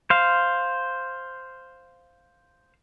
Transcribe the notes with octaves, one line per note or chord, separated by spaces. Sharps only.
C5 F5